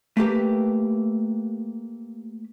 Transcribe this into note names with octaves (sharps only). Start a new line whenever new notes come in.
A3 A#3 G4 B4